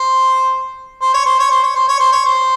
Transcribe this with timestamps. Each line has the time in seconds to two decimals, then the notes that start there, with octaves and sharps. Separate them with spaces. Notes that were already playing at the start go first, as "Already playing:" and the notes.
Already playing: C5
1.02 C5
1.14 C#5
1.26 C5
1.39 C#5
1.51 C5
1.63 C#5
1.76 C5
1.88 C#5
2.00 C5
2.12 C#5
2.25 C5